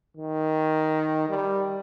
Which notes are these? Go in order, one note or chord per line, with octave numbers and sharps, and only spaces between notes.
D#3
G3